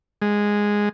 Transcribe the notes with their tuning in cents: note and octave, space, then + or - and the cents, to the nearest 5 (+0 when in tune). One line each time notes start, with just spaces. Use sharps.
G#3 -5